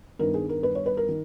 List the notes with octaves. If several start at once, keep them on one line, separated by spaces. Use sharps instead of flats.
G2 D#3 G3 B3 A#4
G#4
A#4
B4
C#5
B4
A#4
D#3